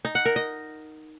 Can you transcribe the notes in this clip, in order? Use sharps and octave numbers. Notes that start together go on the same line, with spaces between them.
D#4
F#5
A#4
D#5